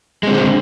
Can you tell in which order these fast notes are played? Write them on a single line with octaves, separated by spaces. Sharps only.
G#3 C4 D3